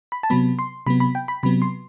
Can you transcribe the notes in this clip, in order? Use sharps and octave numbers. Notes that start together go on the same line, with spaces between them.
B5
A5
C3 F#3 B3 B5
C6
C3 F#3 B3 B5
B5
G5
B5
C3 F#3 B3 B5
C6